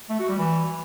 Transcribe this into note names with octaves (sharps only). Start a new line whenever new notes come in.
A3
F#4
G3
E3